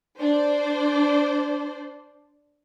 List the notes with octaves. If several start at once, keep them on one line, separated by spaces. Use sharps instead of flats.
D4 C5